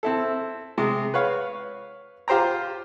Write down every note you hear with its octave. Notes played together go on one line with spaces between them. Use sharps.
C4 E4 A4
C3 G#3
B4 C#5 F5
F4 G4 C5 G5 A#5